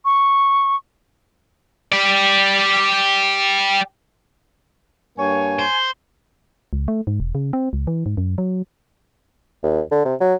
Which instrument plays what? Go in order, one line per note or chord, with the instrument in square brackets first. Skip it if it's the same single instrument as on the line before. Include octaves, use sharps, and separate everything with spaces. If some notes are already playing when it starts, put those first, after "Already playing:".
[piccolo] C#6
[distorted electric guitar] G4 D5
[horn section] G2 A#3 C#5 [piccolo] G#5
[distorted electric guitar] C5
[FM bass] C#2
A3
G#2
E1
C#3
C4
C#2
E3
G#2
F#2
F#3
[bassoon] D#2
D3
C3
F#3